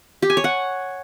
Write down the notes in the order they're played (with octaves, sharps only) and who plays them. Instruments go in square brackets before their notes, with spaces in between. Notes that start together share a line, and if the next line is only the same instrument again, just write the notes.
[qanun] G4
G#5
C#5
F#5